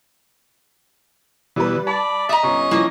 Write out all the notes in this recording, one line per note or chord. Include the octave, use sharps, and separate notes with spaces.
B2 E3 G3 B4
D5 A5 B5
D#5 E5 A#5
G1 C#4
E3 F3 A#3